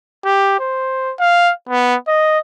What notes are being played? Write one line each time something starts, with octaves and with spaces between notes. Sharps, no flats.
G4
C5
F5
B3
D#5